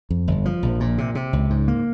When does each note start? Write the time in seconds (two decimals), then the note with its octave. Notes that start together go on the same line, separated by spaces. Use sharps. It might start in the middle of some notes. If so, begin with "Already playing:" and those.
0.10 F2
0.28 G1
0.45 F3
0.63 A#1
0.80 A#2
0.98 C3
1.15 C3
1.33 C#2
1.50 G#2
1.68 A#3